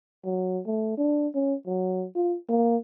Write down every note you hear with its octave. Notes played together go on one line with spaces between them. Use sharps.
F#3
A3
D4
C#4
F#3
F4
A#3